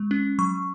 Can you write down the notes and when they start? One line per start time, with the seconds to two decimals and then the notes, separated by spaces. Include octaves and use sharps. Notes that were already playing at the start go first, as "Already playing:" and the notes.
Already playing: G#3
0.11 C#4
0.39 F#3 C#6